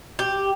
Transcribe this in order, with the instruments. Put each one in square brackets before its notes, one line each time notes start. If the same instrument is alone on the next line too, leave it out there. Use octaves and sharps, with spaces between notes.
[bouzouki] G4